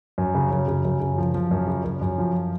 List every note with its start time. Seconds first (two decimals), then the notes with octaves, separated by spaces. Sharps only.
0.18 F#2
0.35 C#3
0.51 F#2
0.68 C#3
0.85 F#2
1.01 C#3
1.18 F3
1.34 F3
1.51 F#2
1.67 C#3
1.84 F#2
2.01 F#2
2.18 F3